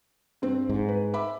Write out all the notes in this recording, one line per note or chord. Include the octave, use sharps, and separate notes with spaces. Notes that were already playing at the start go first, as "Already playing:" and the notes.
G2 C4
G#2
B4
E5 B5 D6